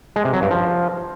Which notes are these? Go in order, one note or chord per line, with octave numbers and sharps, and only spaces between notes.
G#3
C3
F#3
G2
F3